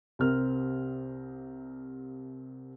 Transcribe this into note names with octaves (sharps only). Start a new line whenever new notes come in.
C2 C3 C4 A#4 F6